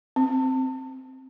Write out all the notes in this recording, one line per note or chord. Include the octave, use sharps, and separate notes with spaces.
C4